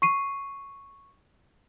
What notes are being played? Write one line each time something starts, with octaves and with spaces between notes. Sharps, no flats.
C#6 C7 D#7